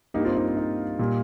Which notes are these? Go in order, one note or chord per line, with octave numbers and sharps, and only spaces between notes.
G2 G3 A#3 D#4 G4
C4 F4
D#4
C4
D#4
A#2 G3 A#3